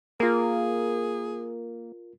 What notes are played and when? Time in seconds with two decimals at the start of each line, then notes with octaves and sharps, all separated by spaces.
0.20 A#3 F4 G#4 A#4